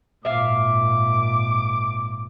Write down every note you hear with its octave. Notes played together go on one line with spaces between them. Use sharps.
G#1 A#2 E5 F5 D6